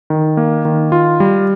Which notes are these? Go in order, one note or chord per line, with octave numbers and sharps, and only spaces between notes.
D#3
A#3
D#3
F4
G3